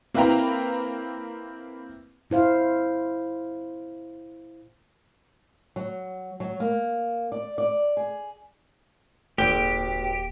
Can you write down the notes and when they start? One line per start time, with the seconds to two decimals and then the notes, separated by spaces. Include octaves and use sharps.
0.14 A#3 C4 E4 B4 G5 A#5
2.30 A#2 E4 C5 F5
5.76 F#3
6.40 F#3
6.60 A#3
7.32 D5
7.58 D5
7.97 G#4
9.38 D#1 G#1 A#3 G4 G5